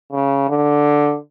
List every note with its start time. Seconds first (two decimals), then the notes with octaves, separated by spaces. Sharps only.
0.12 C#3
0.49 D3